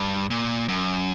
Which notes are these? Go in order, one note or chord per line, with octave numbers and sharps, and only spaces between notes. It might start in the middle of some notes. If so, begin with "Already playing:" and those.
Already playing: G2
A#2
F#2